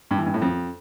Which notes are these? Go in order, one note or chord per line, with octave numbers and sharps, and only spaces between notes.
G2
E3
G2
A2
F2